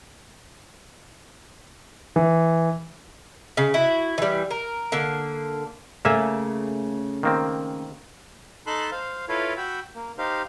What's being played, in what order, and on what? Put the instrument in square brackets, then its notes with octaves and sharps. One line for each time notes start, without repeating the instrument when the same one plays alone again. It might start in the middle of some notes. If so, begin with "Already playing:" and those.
[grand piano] E3
[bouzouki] C#3
E4 F#4
E3 G3
A#4
D3 A#3
[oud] C#3 A3 [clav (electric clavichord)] A#3 E5 G#5
[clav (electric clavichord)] D#3 A#3 C4
[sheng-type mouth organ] D#4 A4 A5 B5 C6 F#6
C5 F5
E4 F4 A4 B4 C#5 F5
F#4 G5 B5 E6
A#3
D#4 G4 C5 F5